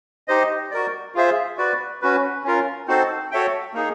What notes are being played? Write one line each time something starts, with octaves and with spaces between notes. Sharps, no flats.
D#4 G4 C5 D#5
F#4 A#4 D5
F4 G#4 C5 E5
F#4 B4 D5
C#4 F#4 B4
C#4 F4 A#4
C4 D#4 F#4 A4 C5
F#4 A4 C#5 E5 G5
A#3 D#4 G#4